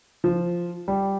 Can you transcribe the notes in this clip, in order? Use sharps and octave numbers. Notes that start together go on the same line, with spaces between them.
F3
G3